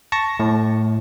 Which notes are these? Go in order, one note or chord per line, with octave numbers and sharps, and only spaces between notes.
A5 C#6 A#6
A2